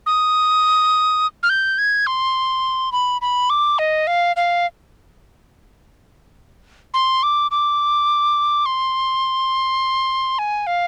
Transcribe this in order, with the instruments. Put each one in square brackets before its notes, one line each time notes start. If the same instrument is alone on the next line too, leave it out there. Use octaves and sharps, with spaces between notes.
[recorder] D#6
F6
G6
G#6
C6
B5
B5
D6
D#5
F5
F5
C6
D6
D6
C6
G#5
F5